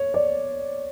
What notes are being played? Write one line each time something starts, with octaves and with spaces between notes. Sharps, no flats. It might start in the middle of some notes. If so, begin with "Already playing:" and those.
Already playing: C#5
D5